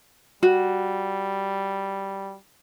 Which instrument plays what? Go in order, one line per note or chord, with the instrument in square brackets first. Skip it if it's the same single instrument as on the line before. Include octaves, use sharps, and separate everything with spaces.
[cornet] G3 [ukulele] F#4